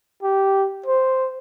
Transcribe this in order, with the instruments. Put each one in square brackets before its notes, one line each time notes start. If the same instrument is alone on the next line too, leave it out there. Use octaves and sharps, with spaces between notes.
[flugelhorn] G4
C5